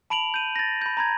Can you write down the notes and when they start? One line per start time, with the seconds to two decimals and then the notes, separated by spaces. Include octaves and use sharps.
0.10 A5 B5 D7 F7 F#7
0.34 G6 D#7
0.56 A6 A#6
0.82 B5 G6
0.97 A#5 B5 G#6